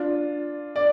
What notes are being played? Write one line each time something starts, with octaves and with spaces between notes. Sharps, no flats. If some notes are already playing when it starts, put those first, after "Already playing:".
Already playing: D4 F4
D5